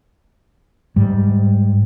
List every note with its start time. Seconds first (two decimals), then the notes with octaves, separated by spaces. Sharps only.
0.96 G#2 G3